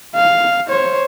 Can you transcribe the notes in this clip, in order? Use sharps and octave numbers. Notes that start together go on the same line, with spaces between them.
F5
C5 C#5